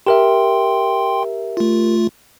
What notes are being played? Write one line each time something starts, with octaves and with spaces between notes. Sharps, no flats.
G4 A#4 E5 G5 C6
A3 F4